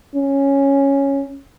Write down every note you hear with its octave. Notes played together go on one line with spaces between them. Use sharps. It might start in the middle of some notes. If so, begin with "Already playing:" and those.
C#4